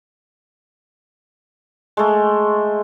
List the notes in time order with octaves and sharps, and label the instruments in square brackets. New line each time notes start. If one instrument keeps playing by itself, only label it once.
[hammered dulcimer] G#3 A3